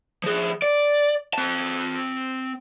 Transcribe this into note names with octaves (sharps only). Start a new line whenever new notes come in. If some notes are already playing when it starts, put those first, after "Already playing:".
F3 G#4
D5
C4 A5